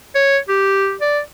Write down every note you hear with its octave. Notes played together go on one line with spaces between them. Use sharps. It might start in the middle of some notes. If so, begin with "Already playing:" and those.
C#5
G4
D5